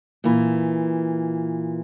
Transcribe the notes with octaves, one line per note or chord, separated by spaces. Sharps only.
A#2 E3